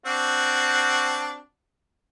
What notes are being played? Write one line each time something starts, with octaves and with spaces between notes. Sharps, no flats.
C4 D4 F#4